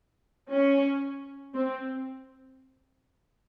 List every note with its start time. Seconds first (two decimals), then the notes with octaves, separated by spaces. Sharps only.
0.50 C#4
1.54 C4